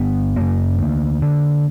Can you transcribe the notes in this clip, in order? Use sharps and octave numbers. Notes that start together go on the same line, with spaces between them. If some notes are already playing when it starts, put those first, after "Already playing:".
Already playing: G1 B3
F#2 C#3 A#3
D2
D3